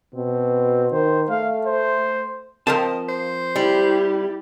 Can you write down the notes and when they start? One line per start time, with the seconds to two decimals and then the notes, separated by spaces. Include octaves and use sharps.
0.15 B2 C4
0.92 D#3 C5
1.30 A3 F5
1.66 C5
2.67 F3 C4 A#4 D#5 A5
3.09 C5
3.56 G3 E4 G4